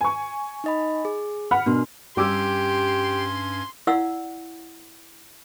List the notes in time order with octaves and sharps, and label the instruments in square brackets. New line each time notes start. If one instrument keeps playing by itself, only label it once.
[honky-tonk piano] G#5 C#6
[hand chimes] D#4 D#5 B5
G#4
[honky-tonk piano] F#5 B5 F6
[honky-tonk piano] B2 [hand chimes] D4 A#4 C6
[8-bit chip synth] G2 C#4 G#6 [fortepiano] G3 D6 E6 [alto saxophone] G4 [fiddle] C6
[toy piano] E4 D5 F5 F#5 E6